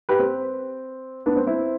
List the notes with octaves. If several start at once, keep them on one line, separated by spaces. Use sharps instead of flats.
G4 B4
C4
B3 D4
C4
C4 E4